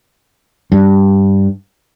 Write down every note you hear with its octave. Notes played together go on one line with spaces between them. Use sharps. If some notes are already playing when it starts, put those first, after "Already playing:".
G2